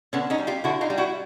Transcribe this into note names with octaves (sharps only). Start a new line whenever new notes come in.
D3 B3 C#4
C#4 D#4
G3
F4 G4
D3 E4 F#4
D#4 F4
G3
E4 F#4